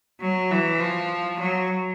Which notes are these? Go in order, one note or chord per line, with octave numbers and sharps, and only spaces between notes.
F#3
E3
F3
F#3